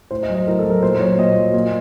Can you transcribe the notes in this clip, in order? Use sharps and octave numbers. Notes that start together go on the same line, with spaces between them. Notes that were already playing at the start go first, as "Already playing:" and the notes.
A2 C5
D#5
F#3
D#5
A2 A#4
A4
F#3
A#4
A#2 C5
C5
F#3 C#5
A#2 D#5
F#3
A#2